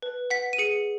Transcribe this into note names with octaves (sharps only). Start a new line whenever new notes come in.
B4
F#5 B6
D#7
G#4 C#7